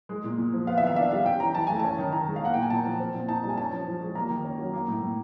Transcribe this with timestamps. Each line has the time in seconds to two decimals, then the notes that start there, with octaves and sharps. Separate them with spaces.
0.09 G#3
0.24 A#2
0.38 A#2
0.53 F3
0.67 B3 F5
0.78 E5
0.82 D#3 F5
0.96 D4 E5
1.11 G3 F5
1.26 C#4 G5
1.40 E3 A#5
1.55 E3 A5
1.67 A3 G#5
1.80 C#4 A5
1.98 D#3
2.12 D#3 A#5
2.28 G#3
2.36 F5
2.41 A#3 F#5
2.54 A#2 G5
2.62 G#5
2.70 A#2 A5
2.84 F3
2.99 C4
3.14 A#2
3.28 D#4 A5
3.43 G3
3.49 G#5
3.57 C#4 A5
3.72 F3
3.87 F3
4.00 G#3
4.15 A#3 A#5
4.30 D#3
4.44 C#4
4.58 F#3
4.73 A#3
4.88 A2
5.02 A2